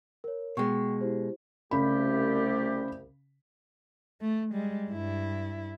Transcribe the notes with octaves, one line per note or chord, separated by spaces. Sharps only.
A#4 C#5
B2 G#3 G5 C#6
E4 G4 C5
C2 C#3 A3 G4 B5
A3
G3 G#3
G2 E4